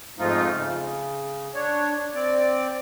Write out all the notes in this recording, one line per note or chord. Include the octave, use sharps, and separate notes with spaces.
F2 G#2 F3 A3 D#4 F4
C#3
D4 C#5
C4 D5